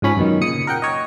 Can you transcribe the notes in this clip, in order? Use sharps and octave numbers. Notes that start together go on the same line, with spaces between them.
G#2 F3 C#4 B5
F#2 B2 D#3
A#2 C#3 D#6 C#7
A#4 F#5 G5
C#5 D#5